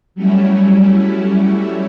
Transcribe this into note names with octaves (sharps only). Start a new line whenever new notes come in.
F#3 G3 A3 C#4 E4